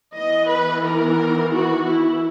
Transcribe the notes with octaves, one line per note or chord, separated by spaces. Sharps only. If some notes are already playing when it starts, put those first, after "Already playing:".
E3 B3 D#5
B4
A#4
F#4
E4